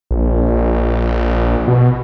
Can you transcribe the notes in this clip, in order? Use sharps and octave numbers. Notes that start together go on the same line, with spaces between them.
A#1
B2